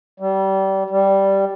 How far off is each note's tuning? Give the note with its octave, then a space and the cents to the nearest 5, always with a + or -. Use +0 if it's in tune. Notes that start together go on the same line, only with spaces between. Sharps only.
G3 -25
G3 -5